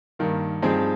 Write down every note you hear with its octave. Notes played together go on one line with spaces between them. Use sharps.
G2 D#3 A#3
G2 F3 C4 D#4 G#4